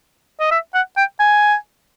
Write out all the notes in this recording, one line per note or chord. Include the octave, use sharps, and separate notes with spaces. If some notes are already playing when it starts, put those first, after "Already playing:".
D#5
E5
F#5
G5
G#5